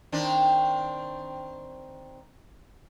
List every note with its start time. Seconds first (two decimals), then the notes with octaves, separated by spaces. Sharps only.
0.12 D#3 C4 D4